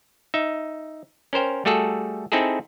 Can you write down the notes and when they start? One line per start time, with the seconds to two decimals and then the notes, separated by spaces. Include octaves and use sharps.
0.34 D#4 E5
1.33 C#4 A#4 C5 G5
1.65 G3 A3 F#4 G#4 A4
2.32 C4 D#4 E4 G#4 A4